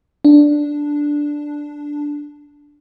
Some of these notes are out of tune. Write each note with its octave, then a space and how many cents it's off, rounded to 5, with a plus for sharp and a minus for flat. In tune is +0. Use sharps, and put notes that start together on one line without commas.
D4 +0